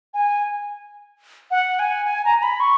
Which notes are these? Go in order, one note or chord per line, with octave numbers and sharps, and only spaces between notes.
G#5
F#5
G#5
G#5
A#5
A#5
B5
C#6